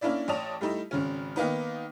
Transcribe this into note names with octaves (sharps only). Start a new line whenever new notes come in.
A#3 C#4 D4 E4 D5
A1 C#5 D5 A5 D#6 F7
G3 A3 D#4 E4
G#1 C#3 C#4
D#3 A#3 B3 D#4